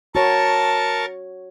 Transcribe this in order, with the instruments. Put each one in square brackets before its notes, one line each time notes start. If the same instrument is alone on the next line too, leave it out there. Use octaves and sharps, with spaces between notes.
[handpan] F#4 C#5 [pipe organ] A#4 C#6 A6 [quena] A5